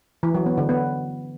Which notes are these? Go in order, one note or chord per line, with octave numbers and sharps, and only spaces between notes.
E3
F#3
B3
D3
B3